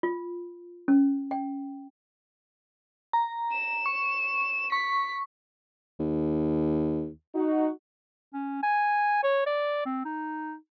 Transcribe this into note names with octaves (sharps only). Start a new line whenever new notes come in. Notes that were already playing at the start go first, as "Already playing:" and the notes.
F4
C#4
G5
A#5
E7
C#6
C#6 B6
D#2
D#4 F#4
C#4
G#5
C#5
D5
C4
D#4